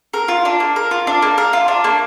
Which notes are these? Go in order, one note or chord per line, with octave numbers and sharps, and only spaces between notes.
A#4
F4
D4
A#3
A#4
F4
D4
A#3
A#4
F4
D4
A#3